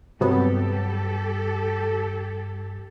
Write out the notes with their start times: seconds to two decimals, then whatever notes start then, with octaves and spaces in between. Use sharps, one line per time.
0.21 G2 C3 F#3 B3 G4 A4